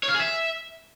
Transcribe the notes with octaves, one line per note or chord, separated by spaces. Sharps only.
C#5
F5
G#4
E5